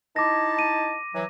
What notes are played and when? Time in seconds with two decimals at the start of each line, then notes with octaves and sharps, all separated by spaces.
0.16 D#4 E4 A5 D6 A#6
0.59 D#7
1.14 E3 F#3